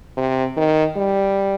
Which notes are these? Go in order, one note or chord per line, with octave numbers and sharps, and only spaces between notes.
C3
D#3
G3